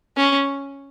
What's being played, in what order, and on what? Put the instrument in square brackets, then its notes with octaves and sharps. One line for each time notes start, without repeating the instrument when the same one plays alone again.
[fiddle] C#4